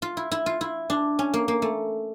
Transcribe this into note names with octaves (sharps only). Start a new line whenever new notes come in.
F4
E4
E4
F4
E4
D4
C#4
A#3
A#3
A3